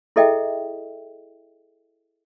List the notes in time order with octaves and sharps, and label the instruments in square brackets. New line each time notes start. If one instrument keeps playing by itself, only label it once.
[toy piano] E4 G#4 A4 D#5 E5 G5